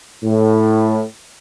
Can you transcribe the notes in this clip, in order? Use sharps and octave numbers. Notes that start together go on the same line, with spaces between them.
A2